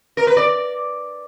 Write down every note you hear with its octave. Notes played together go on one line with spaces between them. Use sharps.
A#4
B4
D5